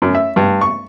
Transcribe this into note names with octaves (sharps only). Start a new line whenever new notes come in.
F#2
E5
G2
C#6